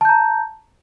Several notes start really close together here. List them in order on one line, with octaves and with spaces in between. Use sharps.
A5 G6 A#5